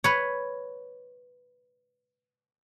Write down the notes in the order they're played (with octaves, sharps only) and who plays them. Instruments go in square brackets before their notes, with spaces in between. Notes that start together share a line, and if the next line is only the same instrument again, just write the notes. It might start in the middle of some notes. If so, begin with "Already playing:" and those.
[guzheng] B4 C#5